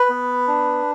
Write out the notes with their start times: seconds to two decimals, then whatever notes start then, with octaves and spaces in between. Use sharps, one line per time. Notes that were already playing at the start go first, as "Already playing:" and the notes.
Already playing: B4
0.10 B3
0.47 D4